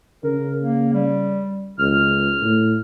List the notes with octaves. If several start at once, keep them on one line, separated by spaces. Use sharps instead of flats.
C#3 A#4
A#3
G3
C#2 F6
A2